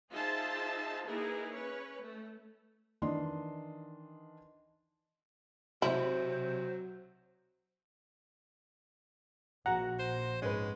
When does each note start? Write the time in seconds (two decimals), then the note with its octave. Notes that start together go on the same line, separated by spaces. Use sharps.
0.11 D#4 F4 G#4 C5 E5 A5
1.05 A#3 D#4 E4 G#4 A#4 B4
1.51 C#4 B4 C#5
1.99 A3
3.02 D#3 E3 D4 D#5 C6
5.82 B1 C3 F#3 E4 C5
9.66 A#1 A#2 F3 F#4 F#5 A#5
9.99 C5
10.42 G#2 G#3 C#4 B4